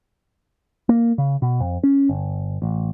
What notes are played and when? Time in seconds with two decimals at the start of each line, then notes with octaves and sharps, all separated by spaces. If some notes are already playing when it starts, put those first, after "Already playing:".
0.89 A#3
1.18 C#3
1.42 B2
1.60 F2
1.83 C#4
2.09 G1
2.62 A1